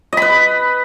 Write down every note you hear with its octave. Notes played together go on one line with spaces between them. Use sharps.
B4 D#5 B5